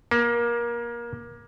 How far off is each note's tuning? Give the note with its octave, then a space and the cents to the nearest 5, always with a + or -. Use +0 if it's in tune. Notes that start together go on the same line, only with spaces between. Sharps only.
A#3 +25